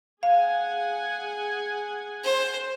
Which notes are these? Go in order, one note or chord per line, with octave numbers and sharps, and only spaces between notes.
G#4 F5 F#5 G#5
C5